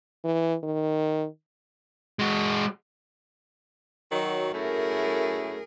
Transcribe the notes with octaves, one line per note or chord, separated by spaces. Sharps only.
E3
D#3
G#3 F#4
D#3 F#3
F#2 A3 E4 G#4 A#4